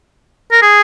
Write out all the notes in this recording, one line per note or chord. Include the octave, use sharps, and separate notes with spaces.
A#4
G#4